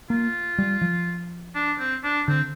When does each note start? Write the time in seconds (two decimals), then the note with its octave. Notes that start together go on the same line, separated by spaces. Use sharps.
0.10 A#3 F4
0.59 G3
0.82 F3
1.55 D4
1.79 C4
2.03 D4
2.28 D3 C4